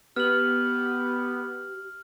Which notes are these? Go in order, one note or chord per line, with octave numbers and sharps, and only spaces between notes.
B3 G4 F6 F#7